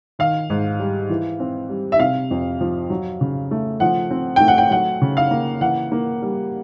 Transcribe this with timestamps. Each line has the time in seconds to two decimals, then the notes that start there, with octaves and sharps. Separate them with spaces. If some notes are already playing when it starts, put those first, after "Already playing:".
0.19 D#3 F5
0.50 G#2
0.80 G3
1.10 E3
1.40 C4
1.69 G3
1.92 E5
1.99 C3 F5
2.31 F2
2.61 F3
2.90 F#3
3.21 C#3
3.51 A3
3.80 F3 F#5
4.11 C4
4.36 A3 G5
4.48 F#5
4.58 G5
4.71 F#3 F#5
5.02 C#3
5.17 F5
5.31 A#3
5.61 E3 F#5
5.92 A#3
6.22 G3